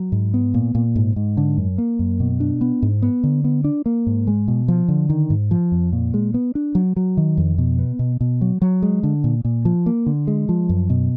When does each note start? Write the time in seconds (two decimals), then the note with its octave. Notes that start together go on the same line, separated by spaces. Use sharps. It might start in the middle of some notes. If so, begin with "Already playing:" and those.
Already playing: F#3
0.12 G#2
0.34 B3
0.54 A#2
0.75 A#2
0.96 G#2
1.16 G#2
1.37 D3
1.58 F#2
1.78 A#3
1.99 F#2
2.20 B2
2.40 D4
2.61 B3
2.82 G#2
3.02 B3
3.24 D3
3.44 B3
3.64 D4
3.86 A#3
4.07 G#2
4.27 G#3
4.48 B2
4.68 F3
4.88 D3
5.10 D#3
5.30 G#2
5.51 F3
5.72 F2
5.93 A#2
6.14 G#3
6.34 B3
6.55 D4
6.75 F#3
6.96 F#3
7.17 D#3
7.37 F2
7.58 B2
7.79 B3
7.99 B2
8.21 B2
8.41 F#3
8.62 F#3
8.82 G#3
9.03 D3
9.24 A#2
9.45 A#2
9.65 F3
9.86 A#3
10.06 D3
10.27 G#3
10.49 F3
10.69 F#2
10.90 B2